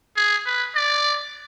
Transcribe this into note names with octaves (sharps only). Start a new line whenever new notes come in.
G#4
B4
D5